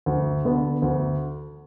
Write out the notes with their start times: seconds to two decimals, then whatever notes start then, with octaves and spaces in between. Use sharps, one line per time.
0.06 D2
0.45 D3 B3
0.82 D2